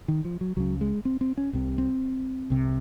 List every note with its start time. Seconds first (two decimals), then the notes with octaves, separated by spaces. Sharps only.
0.08 D#3
0.25 F3
0.41 F#3
0.57 C#2 C#3 F#3
0.81 G#3
1.05 C4
1.21 C4
1.37 C#4
1.53 C2 C3
1.78 C4
2.50 C2 C3